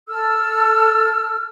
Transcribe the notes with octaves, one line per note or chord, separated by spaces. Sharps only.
A4 E6 F6